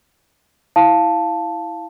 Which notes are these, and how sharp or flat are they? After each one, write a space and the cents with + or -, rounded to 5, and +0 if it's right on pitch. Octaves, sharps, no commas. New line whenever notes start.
E4 -5 F5 +0 A5 +0